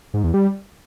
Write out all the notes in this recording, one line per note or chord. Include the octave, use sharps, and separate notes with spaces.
G#2
E2
G3